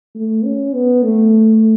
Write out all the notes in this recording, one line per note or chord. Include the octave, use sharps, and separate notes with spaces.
A3
C#4
B3
A3